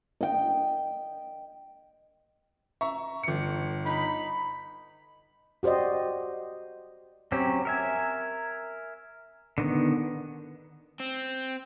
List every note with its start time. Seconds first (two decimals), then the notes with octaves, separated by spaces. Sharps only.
0.21 D#5 G5
2.81 E5 A#5 C#6
3.23 G1 C#7
3.85 D#4 B5
5.63 F#4 G4 C5 D5 D#5
7.32 F#3 C4 C#4 G4
7.65 A#4 E5 G#5
9.58 D3 D#3 B3
11.00 C4